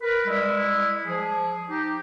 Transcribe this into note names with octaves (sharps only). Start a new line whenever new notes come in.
A#4 B4
G3 G#3 E4
F3 G#4
D#4 G4